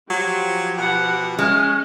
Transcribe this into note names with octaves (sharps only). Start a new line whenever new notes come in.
F3 F#3 G4
B2 F#5
G#3 C#4 F6